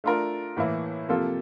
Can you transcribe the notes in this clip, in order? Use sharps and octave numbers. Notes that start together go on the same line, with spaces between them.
A3 D4 F4 A#4
A2 E3 A#3 E4
C3 F3 A#3 F4 A4